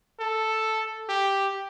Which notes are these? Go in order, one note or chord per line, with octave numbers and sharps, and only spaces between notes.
A4
G4